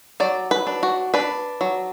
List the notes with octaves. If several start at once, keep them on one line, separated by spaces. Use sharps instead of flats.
F#3 D5
B4
D4
F#4
D4 B4
F#3